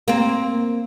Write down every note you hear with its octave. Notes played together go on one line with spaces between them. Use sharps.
A#3 C4